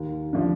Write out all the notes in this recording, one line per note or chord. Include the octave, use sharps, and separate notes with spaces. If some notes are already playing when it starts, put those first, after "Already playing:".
Already playing: D#2
D3 F3